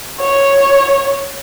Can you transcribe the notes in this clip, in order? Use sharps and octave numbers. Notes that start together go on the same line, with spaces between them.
C#5